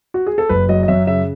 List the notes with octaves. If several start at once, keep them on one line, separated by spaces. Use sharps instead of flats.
F#4
G#4
A4
F#1 B4
F#3 D#5
D#5
F#2 E5
C#3 E5